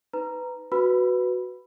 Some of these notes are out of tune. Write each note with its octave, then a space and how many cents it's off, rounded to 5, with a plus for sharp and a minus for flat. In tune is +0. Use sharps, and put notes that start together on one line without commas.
D#4 +25 B4 +20 A#5 +0
F#4 +0 B4 +0 B5 +0